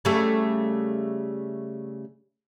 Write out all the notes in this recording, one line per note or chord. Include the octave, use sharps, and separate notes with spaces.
C#3 G3 A3